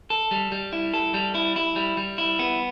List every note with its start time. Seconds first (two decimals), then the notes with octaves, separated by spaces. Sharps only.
0.10 A4
0.31 G3
0.52 G3
0.73 E4
0.94 A4
1.14 G3
1.35 E4
1.56 E4
1.76 G3
1.97 G3
2.18 E4
2.39 B3